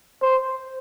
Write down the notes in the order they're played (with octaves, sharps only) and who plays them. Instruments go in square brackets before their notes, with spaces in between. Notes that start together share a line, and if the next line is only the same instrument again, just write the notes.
[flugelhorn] C5